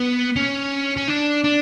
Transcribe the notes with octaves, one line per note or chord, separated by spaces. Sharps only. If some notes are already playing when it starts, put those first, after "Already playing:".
Already playing: B3
C#4
C#4
D4
D4